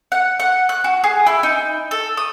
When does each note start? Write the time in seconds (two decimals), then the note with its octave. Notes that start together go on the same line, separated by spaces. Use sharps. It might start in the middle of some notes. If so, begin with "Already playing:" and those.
0.12 F#5
0.40 F#5
0.69 F#6
0.84 F#4
1.04 G#4
1.26 E4
1.43 D#4
1.91 A4
2.17 D#6